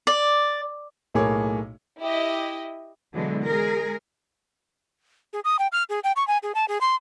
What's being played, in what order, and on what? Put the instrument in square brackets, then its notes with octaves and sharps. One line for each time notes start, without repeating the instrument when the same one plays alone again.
[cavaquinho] D5
[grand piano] B1 A2 A#3 G#4 C#5 D6
[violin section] E4 G4 D#5
[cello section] B2 D3 E3 F#3 G#3
G#3 G#4 A#4
[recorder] G#4
D#6
G5
F6
G#4
G5
C#6
G#5
G#4
A5
G#4
C6